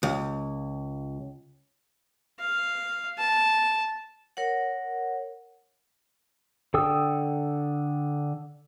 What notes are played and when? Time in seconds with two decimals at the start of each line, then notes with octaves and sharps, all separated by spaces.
0.03 C#2
2.39 F5
3.18 A5
4.37 A#4 C#5 F#5
6.74 D3 A4 G5 D#6 E6